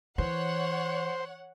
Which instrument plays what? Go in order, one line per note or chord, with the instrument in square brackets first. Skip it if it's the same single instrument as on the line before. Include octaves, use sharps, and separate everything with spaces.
[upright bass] E3 [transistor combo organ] C5 [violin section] C#5 F#5